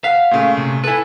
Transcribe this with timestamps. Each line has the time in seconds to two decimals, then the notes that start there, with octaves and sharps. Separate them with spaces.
0.04 F5 F#5 B6
0.31 A#2 C#3 A3
0.57 C3
0.84 E4 A4 B4 G#5